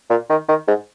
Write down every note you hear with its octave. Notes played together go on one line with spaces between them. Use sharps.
A#2
D#3
D#3
G#2